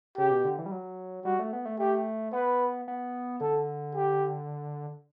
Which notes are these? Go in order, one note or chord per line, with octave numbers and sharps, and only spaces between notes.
C#3 G4
B2
D3
E3
G3
F#3
G3 F#4
A3
B3
A3
A3 G4
B3 B4
B3
D3 A4
G4